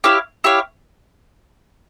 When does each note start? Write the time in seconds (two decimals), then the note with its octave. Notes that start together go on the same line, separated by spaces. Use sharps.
0.04 E4 G4 C#5 F5
0.44 E4 G4 C#5 F5